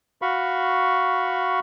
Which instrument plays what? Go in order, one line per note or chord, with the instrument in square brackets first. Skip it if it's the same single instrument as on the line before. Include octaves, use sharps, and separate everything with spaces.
[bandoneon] F#4 F5 B5 C#6